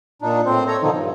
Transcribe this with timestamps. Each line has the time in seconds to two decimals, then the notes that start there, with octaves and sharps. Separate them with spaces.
0.22 A#2 D4 D#4
0.46 A2 C4 C5
0.67 A4 C#5 A#5
0.82 B2 D3 D#3 F3 D#4
0.95 G2